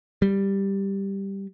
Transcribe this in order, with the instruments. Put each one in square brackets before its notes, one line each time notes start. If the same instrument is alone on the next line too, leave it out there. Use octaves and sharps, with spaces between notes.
[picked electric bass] G3